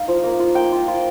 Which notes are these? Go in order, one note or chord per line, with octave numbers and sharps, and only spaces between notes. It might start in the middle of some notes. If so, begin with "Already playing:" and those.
Already playing: D#4 D#5 F5
F3
A#3
F4
A#3 G5
F4
F4